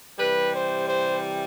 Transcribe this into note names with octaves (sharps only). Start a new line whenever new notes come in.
C3 E3 G3 B4
C5
C5